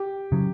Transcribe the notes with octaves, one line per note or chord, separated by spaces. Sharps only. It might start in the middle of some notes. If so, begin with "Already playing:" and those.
Already playing: G4
C#3 F#3